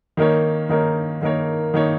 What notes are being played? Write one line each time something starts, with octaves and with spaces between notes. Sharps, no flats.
D#3 A#3 D#4 A#4 C#5
D#3 A#3 D#4 A#4 C#5
D#3 A#3 D#4 A#4 C#5
D#3 A#3 D#4 A#4 C#5